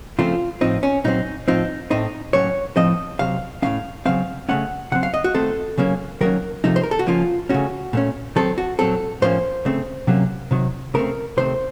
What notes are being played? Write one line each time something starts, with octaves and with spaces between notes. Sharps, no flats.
C#3 F3 A3 C4 F4
A2 F3 C4 D#4
C#4
A#2 F#3 C4 D#4
A2 F3 C4 D#4
A2 A3 C4 D#4
A2 F#3 A#3 C#4 C#5
A2 F3 C4 D#5
C3 F#3 C4 F5
A2 A3 C#4 F5
C#3 F#3 C4 F5
C#3 A3 C#4 F#5
C#3 F#3 C4 F#5
F5
D#5
F#4
D#3 A3 C4 A4
C#3 F#3 A#3 C#4
D#3 F#3 A#3 C#4 A#4
C3 F3 A3 D#4
C5
A#4
A4
F#4
C#3 F3 A#3 C#4 F4
C#3 A3 C#4 F#4
A#2 A3 C#4
D#3 F#3 C4 A4
F#4
A#2 F#3 C4 A4
A2 F3 A#3 C#4 C5
C#3 A3 C4
C3 F#3 A#3 C#4
C3 D#3 F#3
C#3 A3 C4 A#4
C3 D#3 A3 C4 C5